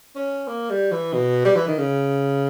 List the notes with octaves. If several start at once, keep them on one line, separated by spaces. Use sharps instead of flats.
C#4
A#3
G3
E3
B2
G3
E3
D#3
C#3